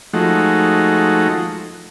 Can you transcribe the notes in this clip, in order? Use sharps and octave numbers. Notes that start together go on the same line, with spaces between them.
F3 G#3 A3 D#4 F#4